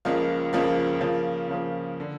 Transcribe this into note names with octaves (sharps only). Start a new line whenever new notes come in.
C#2 C#3 F3 A#3
C#2 C#3 F3 A#3
C#3 F3 A#3
C#3 F3 A#3
D3